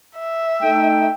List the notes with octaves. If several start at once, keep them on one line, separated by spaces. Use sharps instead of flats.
E5
A3 D#4 G5